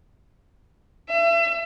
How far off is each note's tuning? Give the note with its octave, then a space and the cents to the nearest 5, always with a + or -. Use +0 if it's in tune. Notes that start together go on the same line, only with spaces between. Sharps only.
E5 +35